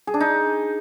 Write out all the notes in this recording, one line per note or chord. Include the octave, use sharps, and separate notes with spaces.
G#4
D4
D#4